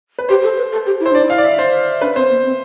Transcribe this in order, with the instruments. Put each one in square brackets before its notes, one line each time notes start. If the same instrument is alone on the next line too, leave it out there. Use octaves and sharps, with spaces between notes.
[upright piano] B4
[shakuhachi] G4 [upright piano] C5
[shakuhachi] A4
B4
A4
G4
E4
[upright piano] C5
[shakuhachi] D4 [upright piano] D5
[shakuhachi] E4
[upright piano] F5
D5
E5
C5
[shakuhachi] D4 [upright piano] B4
[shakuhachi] C4 [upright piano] C5
[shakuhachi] B3
C4